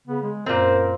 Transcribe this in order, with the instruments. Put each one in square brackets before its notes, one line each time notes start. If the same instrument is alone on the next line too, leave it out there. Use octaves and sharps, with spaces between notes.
[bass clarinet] C#3 [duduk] B3
[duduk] G#3
[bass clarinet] F#2 [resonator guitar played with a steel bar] A#2 C4 [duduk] A#4 [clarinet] C5